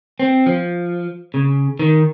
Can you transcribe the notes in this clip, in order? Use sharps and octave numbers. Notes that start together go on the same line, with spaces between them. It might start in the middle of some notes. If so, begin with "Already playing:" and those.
C4
F3
C#3
D#3